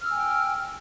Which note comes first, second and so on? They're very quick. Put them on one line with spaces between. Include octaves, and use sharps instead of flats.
F6 E6 G#5 G5